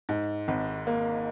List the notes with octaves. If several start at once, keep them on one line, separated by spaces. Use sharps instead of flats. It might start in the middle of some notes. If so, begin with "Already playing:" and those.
G#2
G#1
A#3